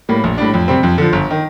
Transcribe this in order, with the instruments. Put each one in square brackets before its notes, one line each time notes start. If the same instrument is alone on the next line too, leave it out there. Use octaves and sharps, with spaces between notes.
[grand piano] A2 G3 A#3
A#1
A2 G3 D4
F2
C3 G3 C4
F2
D3 F3
G1
D#3